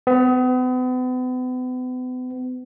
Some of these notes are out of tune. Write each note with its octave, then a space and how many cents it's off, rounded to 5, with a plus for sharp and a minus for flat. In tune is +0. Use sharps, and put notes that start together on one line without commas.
B3 +40